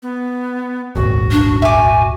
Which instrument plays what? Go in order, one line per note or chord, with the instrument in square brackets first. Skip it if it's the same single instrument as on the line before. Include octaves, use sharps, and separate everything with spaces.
[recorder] B3
[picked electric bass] D#1 G#1 C#2 [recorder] F#4
[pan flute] D4
[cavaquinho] E5 D6 [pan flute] G#5